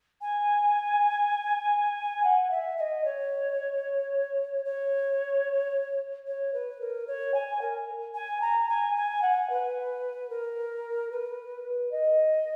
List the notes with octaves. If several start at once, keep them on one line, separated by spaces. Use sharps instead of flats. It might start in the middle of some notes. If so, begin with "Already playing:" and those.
G#5
F#5
E5
E5
D#5
C#5
C#5
C#5
B4
A#4
C#5
G#5
A#4
G#5
A#5
G#5
G#5
F#5
B4
A#4
B4
D#5